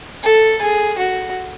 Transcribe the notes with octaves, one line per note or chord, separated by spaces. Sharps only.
A4
G#4
F#4